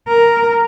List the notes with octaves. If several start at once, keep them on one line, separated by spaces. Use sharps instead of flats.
A#4